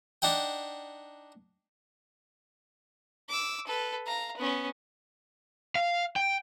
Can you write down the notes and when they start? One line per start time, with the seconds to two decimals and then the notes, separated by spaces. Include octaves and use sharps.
0.22 D4 D#4 F#5 G5
3.29 D6 E6
3.67 A4 B4
4.06 F5 A#5
4.37 B3 C#4
5.75 F5
6.16 G5